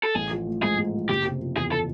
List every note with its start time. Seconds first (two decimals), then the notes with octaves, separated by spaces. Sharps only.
0.03 A4
0.15 A1 G#4
0.31 F3
0.47 A3
0.62 G#2 G#4
0.78 A1
0.93 F3
1.09 F#1 G4
1.25 C3
1.40 F3
1.56 E2 G#4
1.72 A4